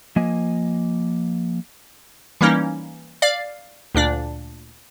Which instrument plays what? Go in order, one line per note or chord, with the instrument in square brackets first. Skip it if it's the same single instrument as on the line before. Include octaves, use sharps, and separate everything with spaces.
[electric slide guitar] F3 A#3 D#5 G#5
[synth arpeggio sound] E3 G3 A#3 C#4 D#4
D5 F5
D2 A#2 D4 D5